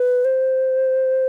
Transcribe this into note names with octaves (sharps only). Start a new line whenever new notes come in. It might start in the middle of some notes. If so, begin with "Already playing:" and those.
Already playing: B4
C5